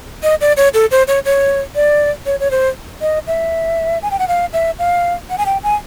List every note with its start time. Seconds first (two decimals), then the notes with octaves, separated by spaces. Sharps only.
0.23 D#5
0.41 D5
0.57 C#5
0.74 A4
0.91 C5
1.08 C#5
1.25 C#5
1.75 D5
2.26 C#5
2.40 C#5
2.51 C5
3.01 D#5
3.27 E5
4.02 G#5
4.11 G5
4.19 F#5
4.28 F5
4.53 E5
4.79 F5
5.30 F#5
5.38 G#5
5.46 G5
5.63 G#5